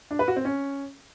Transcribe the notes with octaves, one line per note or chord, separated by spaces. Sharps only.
D4
B4
F#4
C4
C#4